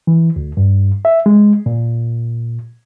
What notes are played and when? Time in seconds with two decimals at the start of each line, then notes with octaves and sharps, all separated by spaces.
0.07 E3
0.36 D2
0.57 G2
1.05 E5
1.26 G#3
1.66 A#2